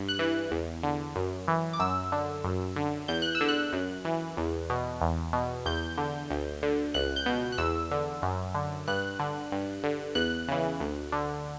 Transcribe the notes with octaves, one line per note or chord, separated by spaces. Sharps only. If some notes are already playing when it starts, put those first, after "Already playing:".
Already playing: G2
F#6
E3
E2
D3
F#2
E3
D6
F#2 E6
D3
F#2
D3
E2 G6
F#6
E6
D3
F#6
F#2
E3
E2
B2
E2
B2
E2 G6
D3
D2
D3
C#2 F#6
G6
B2
F#6
E2 E6
D3
F#2
D3
G2 F#6
D3
G2
D3
E2 F#6
C#3 E3
D2
D3